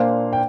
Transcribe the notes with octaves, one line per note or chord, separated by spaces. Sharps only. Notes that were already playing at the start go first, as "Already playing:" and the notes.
Already playing: A#2 A#3 D4 C5 F5
G5